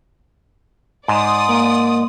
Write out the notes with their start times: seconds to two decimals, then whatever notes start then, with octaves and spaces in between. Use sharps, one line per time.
1.08 G#2 D5 C6 D#6
1.48 A#3